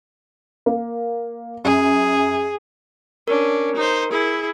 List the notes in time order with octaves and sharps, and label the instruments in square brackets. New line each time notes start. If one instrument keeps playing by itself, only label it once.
[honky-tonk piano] A#3
[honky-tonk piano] F#2 [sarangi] G#4
[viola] C#4 D4 [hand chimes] A#4
[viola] D#4 C5
E4 G#4